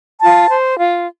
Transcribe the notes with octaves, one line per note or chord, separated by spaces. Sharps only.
F4 A5
C5
F4